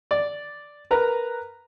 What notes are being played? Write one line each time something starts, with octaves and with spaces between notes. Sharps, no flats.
D5
A#4 B4 A#5